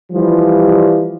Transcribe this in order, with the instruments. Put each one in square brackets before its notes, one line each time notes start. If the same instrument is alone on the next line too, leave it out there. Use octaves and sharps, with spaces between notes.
[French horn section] E3 F3 G3